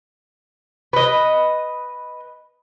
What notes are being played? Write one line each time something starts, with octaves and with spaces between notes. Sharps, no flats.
B4 D#5